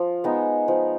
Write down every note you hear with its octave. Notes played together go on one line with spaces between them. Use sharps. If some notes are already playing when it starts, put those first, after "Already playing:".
Already playing: F3
G#3 B3 D#4
F3